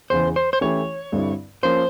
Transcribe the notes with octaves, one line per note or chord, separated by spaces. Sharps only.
E2 C#3 E3 C5
C5
C5
E3 A3 C#4 E4 G4 C#5
G2 D3 G3 C4 E4
F3 A#3 C#4 C5